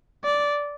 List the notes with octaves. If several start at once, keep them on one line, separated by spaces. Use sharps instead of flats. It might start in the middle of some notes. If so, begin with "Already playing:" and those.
D5